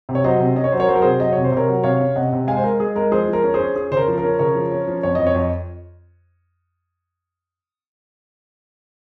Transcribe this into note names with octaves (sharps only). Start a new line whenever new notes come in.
C3
C#5
F#3 C5 D#5
C3
C#4 D#5
C#5
F#3 C5
A#4 C#5
F#3 C5
A#4
C3 G#4 C5
F#3 D#5
C3 C#5
C5
C3 A#4 C#5
F#3
C3 C#5 F5
C#4
C3 D#5 F#5
C3
G#3 F5 G#5
C5
G#3 A#4
G#3 G#4
G#3 A#4
F3 G#4 C5
F3
A#4
C#4
G#4 C5
C#4
C#4 G#4
C#3 C5
A#4
F3
A#4
C#4
C#3 A#4 C#5
F3
C#4
F3
F2 C#5
F2 D#5
C#5
F2 D#5